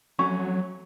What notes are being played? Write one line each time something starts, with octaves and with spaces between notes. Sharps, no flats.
F2 F#3 A3 C#4 C#6